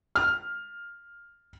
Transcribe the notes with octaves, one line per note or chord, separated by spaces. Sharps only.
F6